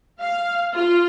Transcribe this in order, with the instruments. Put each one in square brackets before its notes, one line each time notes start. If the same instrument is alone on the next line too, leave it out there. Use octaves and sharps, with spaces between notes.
[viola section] F5
F4